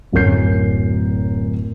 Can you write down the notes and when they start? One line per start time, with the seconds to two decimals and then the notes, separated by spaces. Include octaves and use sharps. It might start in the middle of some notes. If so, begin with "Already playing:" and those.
0.12 D1 F#2 C#4 A#4 G6 C7